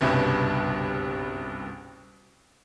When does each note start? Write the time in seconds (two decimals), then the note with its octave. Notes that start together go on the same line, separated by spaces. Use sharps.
0.01 F#1 C2 G2 B2